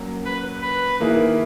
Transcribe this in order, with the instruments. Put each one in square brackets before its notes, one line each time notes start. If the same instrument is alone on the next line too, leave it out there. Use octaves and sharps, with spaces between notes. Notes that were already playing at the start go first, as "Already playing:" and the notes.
Already playing: [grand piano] F#3 A#3 C#4
[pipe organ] B4
B4
[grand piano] D#3 A#3 E4 G#4